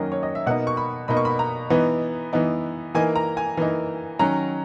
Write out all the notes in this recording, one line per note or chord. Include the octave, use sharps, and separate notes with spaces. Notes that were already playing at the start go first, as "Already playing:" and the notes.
Already playing: D#3 F#3 A#3 C#4 D#5
C#5
D#5
E5
B2 A#3 D#4 F#5
C#6
B5
B2 A#3 D#4 B5
C#6
B5
A#5
E3 B3 D#4
E3 B3 D#4
E3 A#3 D#4 G#5
A#5
G#5
E3 A#3 D#4
D#3 F#3 C#4 A#5